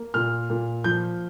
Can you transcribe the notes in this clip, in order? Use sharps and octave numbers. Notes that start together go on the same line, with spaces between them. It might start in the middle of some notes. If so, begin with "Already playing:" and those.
Already playing: A#3
A#2 F6
A#2
F3 G6